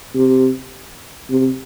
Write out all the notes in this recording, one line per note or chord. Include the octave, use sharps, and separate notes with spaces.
C3
C3